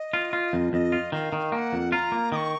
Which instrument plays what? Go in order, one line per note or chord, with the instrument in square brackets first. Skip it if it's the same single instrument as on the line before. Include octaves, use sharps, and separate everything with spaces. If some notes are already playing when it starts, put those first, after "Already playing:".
Already playing: [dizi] D#5
[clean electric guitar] F4
F4
F2
[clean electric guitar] F2 [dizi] D#5
[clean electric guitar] F4
[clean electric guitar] D#3 [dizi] F5
[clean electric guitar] D#3
[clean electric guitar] A#3 [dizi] A#5
[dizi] F#5
[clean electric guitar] F2
[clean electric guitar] F4 [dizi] A#5
[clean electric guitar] A#3
[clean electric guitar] D#3 [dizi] D#6
[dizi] C#6